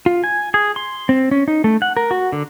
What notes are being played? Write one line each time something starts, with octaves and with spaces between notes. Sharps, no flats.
F4
G#5
G#4
C6
C4
C#4
D#4
A3
F#5
A#4
F#4
D3